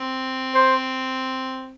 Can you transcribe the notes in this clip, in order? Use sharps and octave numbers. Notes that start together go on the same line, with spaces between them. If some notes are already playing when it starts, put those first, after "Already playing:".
Already playing: C4
C5